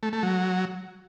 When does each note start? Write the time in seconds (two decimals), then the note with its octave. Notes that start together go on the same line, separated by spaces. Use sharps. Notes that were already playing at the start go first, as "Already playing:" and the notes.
0.03 A3
0.13 A3
0.23 F#3